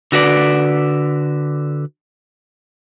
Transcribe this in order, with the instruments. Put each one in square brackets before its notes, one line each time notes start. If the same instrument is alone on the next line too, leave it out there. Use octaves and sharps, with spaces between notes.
[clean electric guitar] D3 F#4 B4 D5